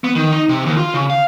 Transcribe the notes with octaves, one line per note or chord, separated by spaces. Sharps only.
B3
D#3
D#4
C3
D#2
F4
C#3
F5